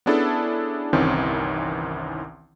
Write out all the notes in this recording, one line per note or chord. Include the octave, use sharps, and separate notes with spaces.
B3 C#4 D4 E4 G#4 A4
G1 C2 D#3 E3 C4 C#4